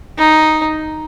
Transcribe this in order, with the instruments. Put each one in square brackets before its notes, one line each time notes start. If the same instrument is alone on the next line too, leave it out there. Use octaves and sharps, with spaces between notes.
[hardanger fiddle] D#4